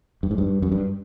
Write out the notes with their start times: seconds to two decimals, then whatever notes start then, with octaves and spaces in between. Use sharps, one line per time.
0.23 G2
0.31 G#2
0.38 G2
0.62 F#2
0.72 G2